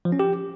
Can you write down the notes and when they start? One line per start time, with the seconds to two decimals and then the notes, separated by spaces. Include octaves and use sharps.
0.05 F3
0.12 C#4
0.20 G4